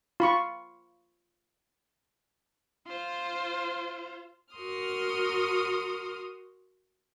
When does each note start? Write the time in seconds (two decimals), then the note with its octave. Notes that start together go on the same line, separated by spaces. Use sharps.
0.20 F4 B5 C#6
2.88 F4 C5
4.54 F#4 A#4 C6 D#6 F6